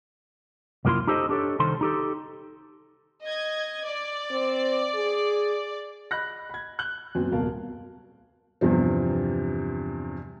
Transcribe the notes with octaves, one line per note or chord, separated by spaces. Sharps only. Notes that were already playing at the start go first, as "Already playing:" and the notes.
C2 F#2 A#3 E4 F4 C6
D#4 G4 A4 C5 C#5 D#5
D4 G4 A4 C#5
C2 D#3 A4 C5 C6
D#4 G4 A4
D#5 G#6
D5
C4
G#4
D#5 B5 F#6 A#6
B5 G#6
F#6 F#7 G7
F#2 A#2 B3 C4
D#1 C2 B2 A#4 F5 A5
E2 G2 C3 F3